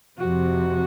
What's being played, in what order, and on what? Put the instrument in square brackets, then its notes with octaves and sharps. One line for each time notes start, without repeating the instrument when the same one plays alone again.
[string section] F2 C3 F3 [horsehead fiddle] F#4